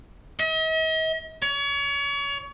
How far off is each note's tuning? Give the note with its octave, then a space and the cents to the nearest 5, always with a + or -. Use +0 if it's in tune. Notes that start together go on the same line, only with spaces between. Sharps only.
D#5 +45
C#5 +35